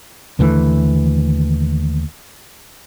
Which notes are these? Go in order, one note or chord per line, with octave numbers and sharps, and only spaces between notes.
D#2 D3 E3 A3